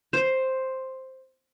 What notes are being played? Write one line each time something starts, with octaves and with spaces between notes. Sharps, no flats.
C5